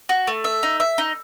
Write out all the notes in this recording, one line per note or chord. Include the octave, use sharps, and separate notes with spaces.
F#4
A3
E5
D#4
E5
D#4